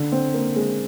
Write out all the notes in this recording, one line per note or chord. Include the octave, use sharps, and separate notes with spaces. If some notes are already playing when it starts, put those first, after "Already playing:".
Already playing: D3
C4
A#3
G#3